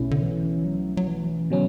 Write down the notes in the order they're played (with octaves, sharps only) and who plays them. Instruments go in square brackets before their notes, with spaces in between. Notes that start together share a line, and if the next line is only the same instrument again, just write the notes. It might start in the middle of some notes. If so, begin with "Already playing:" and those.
Already playing: [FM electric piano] B1 B2 A3 C#4 E4
[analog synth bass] D3
E3
F#3
F#3
E3
[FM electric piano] B2 F#3 C#4 [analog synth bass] D3